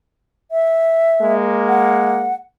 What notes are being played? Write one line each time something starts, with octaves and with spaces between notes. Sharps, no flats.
E5
G#3 A#3
F#5